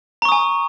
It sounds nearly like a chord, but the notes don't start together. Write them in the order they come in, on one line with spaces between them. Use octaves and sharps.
A#5 C#6 D#6 G#5